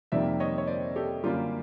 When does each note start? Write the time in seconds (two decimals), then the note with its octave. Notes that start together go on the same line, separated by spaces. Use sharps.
0.12 F2 C3 D#3 G3 A#3 D5 E5
0.40 C#5 D#5
0.58 C#5
0.67 C5 D5
0.96 G4 A4
1.23 F#2 D3 G3 A#3 F4 G4